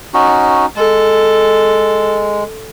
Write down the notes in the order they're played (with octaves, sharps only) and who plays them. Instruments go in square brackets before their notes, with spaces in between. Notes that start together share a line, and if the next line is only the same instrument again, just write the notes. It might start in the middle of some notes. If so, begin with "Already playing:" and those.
[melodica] C#4 D#4 F#4
[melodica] G#3 [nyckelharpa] A4